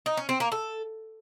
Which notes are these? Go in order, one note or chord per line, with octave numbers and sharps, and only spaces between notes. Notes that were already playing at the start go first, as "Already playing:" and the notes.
D#4
C#4
C4
A#3
A4